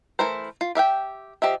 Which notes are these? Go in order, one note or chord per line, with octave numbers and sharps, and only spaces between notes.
E3 A3 E4 A#4 C5
F4
G4 E5 F5 G5
F3 G4 D#5 E5